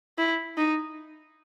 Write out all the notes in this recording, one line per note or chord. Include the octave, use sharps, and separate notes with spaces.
E4
D#4